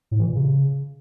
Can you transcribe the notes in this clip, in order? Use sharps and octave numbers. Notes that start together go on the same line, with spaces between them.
A2
E3
A#2
C#3